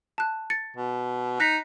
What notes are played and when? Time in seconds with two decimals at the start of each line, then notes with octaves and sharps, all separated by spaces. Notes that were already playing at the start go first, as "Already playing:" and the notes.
0.18 A5 F#6
0.50 A6 C#7
0.77 B2
1.40 D#4 F#6 A#6 B6